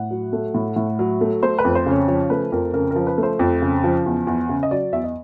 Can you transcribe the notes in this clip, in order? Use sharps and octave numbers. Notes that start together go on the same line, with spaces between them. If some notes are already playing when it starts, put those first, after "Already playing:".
Already playing: A2 F#5
F#3
A3
A2
A2
F#3
A3
A3 C5
B4
F2
C5
C#3
C#5
F3 C#5
A3 B4
F2 A#4
C#3 A#4
F3 A#4
B4
A3
C5
F2
C#3
F3
E2
E2
C#3
D#5
F#3 D5
E2 E5
D#5